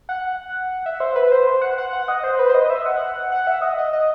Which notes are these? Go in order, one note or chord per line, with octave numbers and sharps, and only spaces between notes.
F#5
E5
C5
B4
C5
C5
F#5
F#5
F#5
D#5
C5
B4
C5
D#5
E5
F#5
F#5
E5
D#5
D#5
D#5